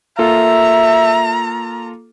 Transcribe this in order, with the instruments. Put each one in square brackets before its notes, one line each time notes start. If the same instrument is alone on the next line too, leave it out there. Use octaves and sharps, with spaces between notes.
[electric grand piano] A#3 F4 A4 [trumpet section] E5 [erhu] A#5